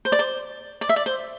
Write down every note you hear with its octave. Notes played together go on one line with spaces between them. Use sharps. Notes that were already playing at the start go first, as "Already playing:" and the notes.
C5
D5
C5
D5
E5
D5
C5